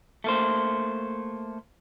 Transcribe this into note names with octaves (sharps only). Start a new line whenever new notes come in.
A3 A#3 C5